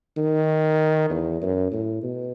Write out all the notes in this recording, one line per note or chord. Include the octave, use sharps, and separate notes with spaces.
D#3
E2
F#2
A2
B2